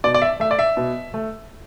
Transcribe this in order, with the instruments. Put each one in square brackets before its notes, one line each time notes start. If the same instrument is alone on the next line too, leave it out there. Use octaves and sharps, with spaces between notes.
[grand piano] B2 D5
D5
E5
A3 E5
D5
E5
B2
A3